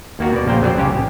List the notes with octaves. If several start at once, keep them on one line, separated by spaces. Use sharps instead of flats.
D#2 A#3 F#4
B2 D5
A#1 C#3 A#3 C5 G5
F2 F#3 C5 D5
C2 C#3 C#4 G4
A1